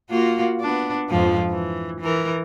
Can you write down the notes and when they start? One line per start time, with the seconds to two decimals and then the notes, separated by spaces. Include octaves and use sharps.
0.10 A#3 F4 F#4
0.60 B3 D4
1.09 F2 G#2 F3
1.50 E3
2.01 E3 A#4